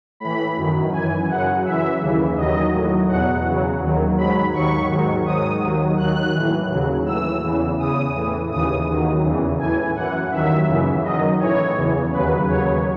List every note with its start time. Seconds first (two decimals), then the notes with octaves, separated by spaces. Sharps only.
0.20 A2 E3 B5
0.57 F#2 D#3 F#3
0.92 F#2 E3 G#5
1.29 F#2 C#3 F#3 F#5
1.65 F#2 E3 E5
2.01 D#2 C#3 E3
2.37 D#2 D#3 F#3 D#5
2.73 A2 F#3
3.09 E2 B2 F#3 F#5
3.45 E2 C#3 F#3
3.81 D#2 D#3 F#3
4.17 G#2 F#3 B5
4.53 D#2 D#3 F#3 C#6
4.89 G#2 D#3 F#3
5.25 G#2 D#3 F#3 D#6
5.62 D#2 D#3 F#3
5.98 D#2 D#3 F#3 F#6
6.35 A2 E3
6.71 D#2 C#3 F#3
7.06 A2 E3 E6
7.43 E2 C#3 E3
7.78 E2 C#3 E3 D#6
8.15 A2 E3
8.50 D#2 C#3 E3 D#6
8.87 D#2 D#3 F#3
9.23 E2 C#3 E3
9.59 A2 E3 G#5
9.95 F#2 E3 F#5
10.31 D#2 D#3 F#3 E5
10.67 F#2 C#3 E3
11.04 F#2 D#3 F#3 D#5
11.40 A2 E3 C#5
11.76 E2 C#3 E3
12.12 D#2 C#3 F#3 B4
12.48 D#2 C#3 F#3 C#5